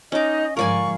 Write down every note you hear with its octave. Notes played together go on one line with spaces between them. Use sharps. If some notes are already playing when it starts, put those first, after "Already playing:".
C#4 D#4 D#5 D6
G#2 D3 F3 A#4 D5 F5 G#5 C#6